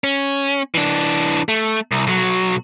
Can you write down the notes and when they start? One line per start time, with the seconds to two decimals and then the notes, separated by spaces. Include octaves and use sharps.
0.04 C#4
0.75 E3 D4
1.49 A3
1.91 C2
2.07 B1 F#3